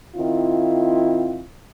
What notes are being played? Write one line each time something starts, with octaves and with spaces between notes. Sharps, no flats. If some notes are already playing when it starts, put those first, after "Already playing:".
D#3 C4 E4 F4